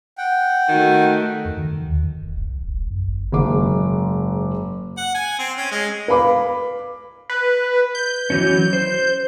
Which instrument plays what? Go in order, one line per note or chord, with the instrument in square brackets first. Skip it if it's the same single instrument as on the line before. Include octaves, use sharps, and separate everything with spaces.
[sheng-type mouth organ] F#5 G5
[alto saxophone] D#3 [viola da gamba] A3 F#4
[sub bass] F2
D#3
D#3
D#2
F2
D1
B1
B1
D#1
A#1
F#2
G1
[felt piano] F#1 G#2 D6
[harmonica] F#5
G#5
C4
C#4
G#3
[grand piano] B4 F5 B5 D6
[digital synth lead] B4
G6
[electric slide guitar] E3 F#3 C#4
C5